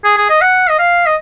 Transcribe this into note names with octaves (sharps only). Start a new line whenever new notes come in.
G#4
G#4
D#5
F#5
D#5
F5
D#5